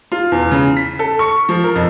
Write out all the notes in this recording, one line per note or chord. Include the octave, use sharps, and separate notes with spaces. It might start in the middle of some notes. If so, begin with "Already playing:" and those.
F4
E2
C#3
B6
A4
C#6
F3
A#4
F2